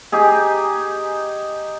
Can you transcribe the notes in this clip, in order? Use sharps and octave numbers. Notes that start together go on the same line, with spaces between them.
D#4 G4 G#4